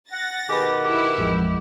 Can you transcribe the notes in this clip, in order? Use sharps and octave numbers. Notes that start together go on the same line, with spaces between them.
F#5 A6 A#6
B2 D#3 G4 G#4 B4 F#5
E4 G4
A1 F2 G#3